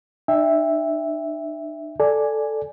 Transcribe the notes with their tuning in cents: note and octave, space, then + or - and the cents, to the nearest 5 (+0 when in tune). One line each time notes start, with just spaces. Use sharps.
D4 +45 E5 +0 G5 +35
A4 +0 D5 +0 G#5 +0